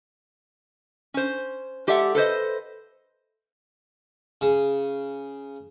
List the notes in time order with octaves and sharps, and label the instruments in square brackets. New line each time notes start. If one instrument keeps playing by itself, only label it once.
[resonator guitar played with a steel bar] C#4 C5
G#3 G4 A4 D5 E5 F#5
A4 B4 C5 D#5
[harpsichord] C#3